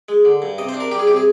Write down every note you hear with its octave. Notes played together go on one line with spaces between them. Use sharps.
G#3
D3
G2
C3 D#5
C5
D4
A#4
G3 G4
G#4
C3 G4
G#4